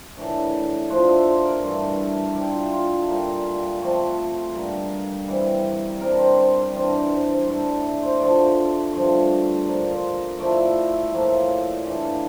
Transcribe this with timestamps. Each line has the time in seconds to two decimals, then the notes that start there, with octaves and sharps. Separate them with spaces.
0.17 A2 E3 A3 D4 A#4
0.90 F3 A3 D4 F4 C5
1.09 E5
1.27 C5
1.45 A#4
1.63 G2 E3 A3
2.35 D3 A3 E4 G4
2.47 F4
2.55 G4
2.73 F4
2.90 A4
3.08 A#2 G3 A#3
3.82 C3 F3 A3
4.55 G2 D3 G3 A#3 A#4
5.28 C3 E3 G3
6.00 C3 G3 D4 A#4
6.19 C5
6.37 C5
6.55 D5
6.74 G2 E3 G3 D4 C5
6.92 C5
7.11 C5
7.29 C5
7.47 D3 A3 E4 C5
7.65 D5
7.83 D5
8.02 C5
8.20 D3 F3 A3 D5
8.93 G2 F3 A3
9.65 F3 A#3 D4 D5
9.90 C5
10.14 A#4
10.38 F3 A3 E4 D5
10.57 E5
10.94 E5
11.12 A2 F3 A#3 F4 E5
11.30 E5
11.49 E5
11.67 D5
11.85 E3 A3 D4 E5
12.03 F5